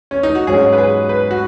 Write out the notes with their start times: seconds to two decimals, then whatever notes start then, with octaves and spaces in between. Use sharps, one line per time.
0.11 C#4
0.23 D#4
0.35 F#4
0.47 G#2 F#3 C#4 G#4
0.73 B4
0.78 G#4
1.09 B4
1.31 F#4